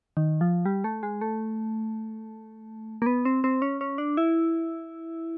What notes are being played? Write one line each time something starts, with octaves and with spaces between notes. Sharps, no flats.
D#3
F3
G3
A3
G#3
A3
A#3
B3
C4
C4
C#4
C#4
D4
E4